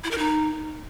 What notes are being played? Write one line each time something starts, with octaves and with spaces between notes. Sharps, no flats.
E4
A#4
D#4